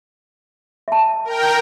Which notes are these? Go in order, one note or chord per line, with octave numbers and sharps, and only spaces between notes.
E5 A5
A#4 G5